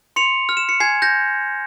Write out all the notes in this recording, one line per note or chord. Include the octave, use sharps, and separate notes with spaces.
C6 C#7 F7
F6
E7
C#7
G#5 G#6 C7
G6 A#6